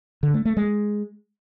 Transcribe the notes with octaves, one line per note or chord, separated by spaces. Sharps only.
D3
A3
A3
G#3